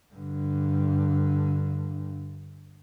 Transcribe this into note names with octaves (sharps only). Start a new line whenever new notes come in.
G2 D3